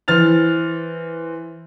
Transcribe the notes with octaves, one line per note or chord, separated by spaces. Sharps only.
E3 C5 F6 A6 F7